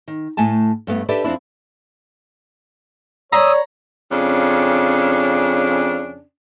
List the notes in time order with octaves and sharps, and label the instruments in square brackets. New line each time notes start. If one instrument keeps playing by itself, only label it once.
[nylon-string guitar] D#3
A2 A3 G#5 A5
G2 A3 B3
D4 G4 A4 B4 D5 E5
F2 C4 D4 E4
[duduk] C#5 [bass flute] D5 [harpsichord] A#5 B5 [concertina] D#6 E6
[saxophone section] F2 C#3 C#4 D4